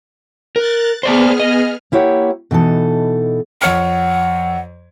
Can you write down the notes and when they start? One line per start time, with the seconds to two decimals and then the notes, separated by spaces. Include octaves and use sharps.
0.56 A#4 F#6 A6
1.03 B3 G#4 C5 D5 A5 F6
1.40 D#5
1.92 A#3 E4 G4 C#5 F#5
2.51 B2 E3 D#4 A4
3.62 F2 C#5 F#5 F6